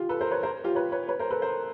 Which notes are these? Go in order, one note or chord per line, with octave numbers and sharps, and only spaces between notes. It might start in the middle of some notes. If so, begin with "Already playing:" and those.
Already playing: F4 G4
A4 B4
A#4 C5
B4 C#5
A#4 C5
F4 G4
B4 C#5
B4 C#5
B4 C#5
A#4 C5
A4 B4
A#4 C5